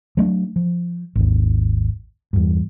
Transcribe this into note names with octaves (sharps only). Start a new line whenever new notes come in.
F#3 A3 C#4 D4
F3
G#1 D#2
E2 G2